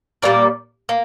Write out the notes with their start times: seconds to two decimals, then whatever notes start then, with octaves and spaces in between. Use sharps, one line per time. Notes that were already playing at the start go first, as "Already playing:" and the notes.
0.22 A#2 G3 A#3 A#4 D5
0.89 A#3